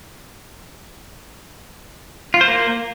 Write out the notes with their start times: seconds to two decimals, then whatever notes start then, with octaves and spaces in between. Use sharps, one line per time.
2.34 F4
2.41 C5
2.48 A#3